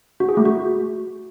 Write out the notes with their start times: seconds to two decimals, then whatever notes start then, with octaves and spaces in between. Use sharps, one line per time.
0.20 F#4
0.29 G#4
0.37 A3
0.45 F#4